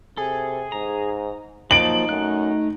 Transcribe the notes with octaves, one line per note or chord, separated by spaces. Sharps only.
C3 G#4 A4
G#2 A#5
F3 F#3 A#3 D#4 A5 D7 F#7
F#2 A3 F#6